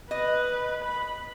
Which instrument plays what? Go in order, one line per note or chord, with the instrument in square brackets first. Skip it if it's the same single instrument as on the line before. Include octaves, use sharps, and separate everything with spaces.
[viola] B4 [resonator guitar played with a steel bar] D#5
[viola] B5